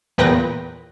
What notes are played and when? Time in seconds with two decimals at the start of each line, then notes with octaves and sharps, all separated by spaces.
0.18 E2 A#2 B4 G5 A#6